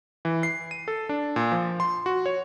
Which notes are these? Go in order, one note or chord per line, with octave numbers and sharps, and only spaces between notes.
E3
C7
D#7
A4
D4
A#2
F3
C6
F#4
C#5